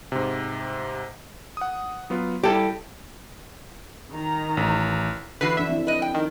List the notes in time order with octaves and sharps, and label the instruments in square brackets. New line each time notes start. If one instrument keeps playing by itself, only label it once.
[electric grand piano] G#2 C3
F#5 D#6
F#3 B3 F4
[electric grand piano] G3 E4 [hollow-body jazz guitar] G4 A4
[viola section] D#3 A#5
[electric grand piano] A1
[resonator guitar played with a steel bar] D3 E3 F#4 [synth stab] B4 C7
[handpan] F3 D4 A4 [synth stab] E5
[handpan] C4 E4
[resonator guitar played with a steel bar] B4 D#5
G5
[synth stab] D#3